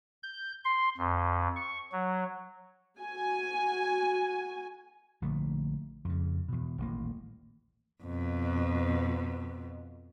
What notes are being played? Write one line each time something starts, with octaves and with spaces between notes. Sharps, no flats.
G6
C6
F2
C#6
F#3
F#4 G#5
A#1 D3 A3
F2 C#3
E2 B2
D#1 A1 A#3
F2 B2